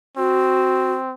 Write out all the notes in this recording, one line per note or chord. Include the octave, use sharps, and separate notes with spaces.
C4 F#4